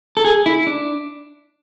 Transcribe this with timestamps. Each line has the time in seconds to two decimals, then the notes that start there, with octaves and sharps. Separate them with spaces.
0.17 A4
0.25 G#4
0.46 E4
0.67 D4